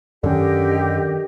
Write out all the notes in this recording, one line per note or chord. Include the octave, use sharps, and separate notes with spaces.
F#2 D3 D#3 C#4 G4 D#5